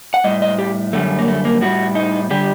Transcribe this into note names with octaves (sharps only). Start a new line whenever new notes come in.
F#5
A2 G3 D#5
D#5
G4
F#2 D3 G3 A3
A#3
A3
A#3
A2 G3 F#4
D#4
D3 G3 G4